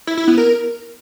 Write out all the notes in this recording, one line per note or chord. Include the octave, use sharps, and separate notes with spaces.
E4
E4
B3
A#4